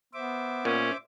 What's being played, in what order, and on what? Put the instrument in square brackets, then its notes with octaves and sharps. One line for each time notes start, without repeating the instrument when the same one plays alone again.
[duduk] B3 [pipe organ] C5 E5 D6
[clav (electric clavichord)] A#2 [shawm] C#4